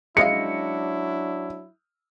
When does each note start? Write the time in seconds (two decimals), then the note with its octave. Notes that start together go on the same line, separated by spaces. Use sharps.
0.17 F#3 G#3 C#4 D4 E4 F5 C#7